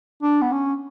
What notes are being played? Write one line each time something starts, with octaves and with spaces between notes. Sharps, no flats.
D4
B3
C#4